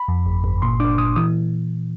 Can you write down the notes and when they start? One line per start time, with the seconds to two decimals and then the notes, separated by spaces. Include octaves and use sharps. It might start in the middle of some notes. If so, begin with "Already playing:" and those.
Already playing: B5
0.08 F2
0.26 G1
0.44 G1
0.62 A#2 C6
0.80 D4 D6
0.98 A#2 D#6
1.16 E3 D#6